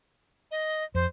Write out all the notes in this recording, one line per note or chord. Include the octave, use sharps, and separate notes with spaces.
D#5
F2 C5